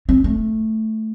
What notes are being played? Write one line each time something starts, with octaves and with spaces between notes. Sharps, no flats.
C4
A3